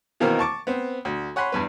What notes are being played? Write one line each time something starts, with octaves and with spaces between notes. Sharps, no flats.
B2 D#3 E3 A#3 C4 A#4
A5 C#6 D6
B3 C4 C5
D2
C#5 F#5 G#5 B5 C6
E2 G2 B4